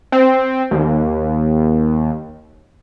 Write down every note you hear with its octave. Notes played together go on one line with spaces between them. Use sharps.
C4
D#2